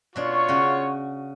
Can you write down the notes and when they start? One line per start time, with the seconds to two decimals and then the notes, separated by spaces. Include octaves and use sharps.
0.16 B2 D4 F4 C#5 C#6
0.49 C#3 F#4